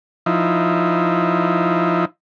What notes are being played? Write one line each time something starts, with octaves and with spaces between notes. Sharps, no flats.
F3 D#4 E4